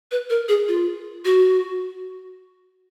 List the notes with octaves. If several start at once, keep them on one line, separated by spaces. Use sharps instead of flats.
B4
A#4
G#4
F4
F#4